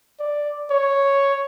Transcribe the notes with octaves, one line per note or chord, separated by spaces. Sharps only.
D5
C#5